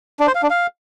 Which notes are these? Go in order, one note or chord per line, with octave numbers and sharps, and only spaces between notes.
D4
C5
F5
D4
F5